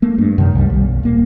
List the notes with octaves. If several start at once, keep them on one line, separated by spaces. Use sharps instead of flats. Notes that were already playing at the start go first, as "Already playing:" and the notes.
A3 A#3
G2
F#2 C3 D#3
C2 G3
B1 G3
D#1 A#3